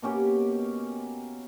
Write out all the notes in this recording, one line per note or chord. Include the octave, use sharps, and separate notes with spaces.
B2 A#3 C#4 G4